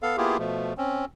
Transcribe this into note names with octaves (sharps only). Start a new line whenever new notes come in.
B3 A4 F5
A#3 B3 E4 F4 G4 G#4
B2 F3 A3
C4 C#4